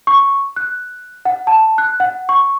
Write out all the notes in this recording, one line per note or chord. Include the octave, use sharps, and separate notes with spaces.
C#6
F#6
F#5
A5
F#6
F#5
C#6